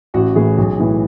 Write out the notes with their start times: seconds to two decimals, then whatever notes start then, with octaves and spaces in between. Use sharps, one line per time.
0.14 A1 F#4
0.35 A2 E3 G#4
0.58 B1
0.80 A2 E3